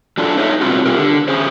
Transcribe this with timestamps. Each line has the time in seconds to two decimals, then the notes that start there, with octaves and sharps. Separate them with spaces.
0.18 F#3 D4 F4 A4
0.37 D#4 B4 C#5 D#5 E5
0.61 B2 G3 C4 F4 F#4
0.86 F4 G4 A#4
0.98 D3
1.28 C#4 G#4 C5